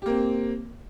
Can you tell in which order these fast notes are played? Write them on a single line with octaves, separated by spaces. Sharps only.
G4 A#3 C4